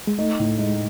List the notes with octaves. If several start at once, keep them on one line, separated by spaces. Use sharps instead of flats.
G#3
A3 D#4
A2
G#3 D#4